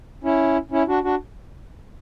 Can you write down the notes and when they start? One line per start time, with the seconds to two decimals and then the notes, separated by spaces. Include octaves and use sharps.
0.24 C#4 E4
0.71 C#4 E4
0.88 D4 F#4
1.04 D4 F#4